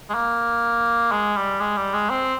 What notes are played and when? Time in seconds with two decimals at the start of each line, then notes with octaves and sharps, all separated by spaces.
0.10 G#3
0.14 A#3
1.12 G#3
1.37 G3
1.60 G#3
1.77 G3
1.94 G#3
2.10 C4